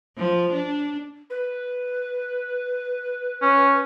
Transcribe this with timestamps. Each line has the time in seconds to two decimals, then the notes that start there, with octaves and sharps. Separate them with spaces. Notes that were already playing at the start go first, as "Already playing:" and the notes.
0.17 F3
0.52 D4
1.30 B4
3.42 C#4